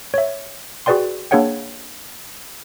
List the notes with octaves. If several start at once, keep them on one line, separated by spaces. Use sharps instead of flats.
C#5 E5
F#4 G#4 B4 D5 G5 C6
A#3 D4 G#4 C#5 F#5 G5